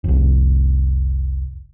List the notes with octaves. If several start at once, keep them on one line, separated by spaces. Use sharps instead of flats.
F1 C2